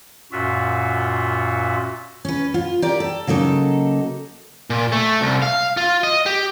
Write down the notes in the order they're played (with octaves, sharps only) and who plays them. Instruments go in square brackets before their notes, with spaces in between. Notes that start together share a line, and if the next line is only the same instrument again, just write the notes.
[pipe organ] F#2 A#2 F4 F#4 E5
[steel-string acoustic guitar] C#4 B4
F4
G4 A#4 D5
A4
C#3 F#3 A#3 D#4 A4
[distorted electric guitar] A#2
A3
C2
F5
F4
D#5
G4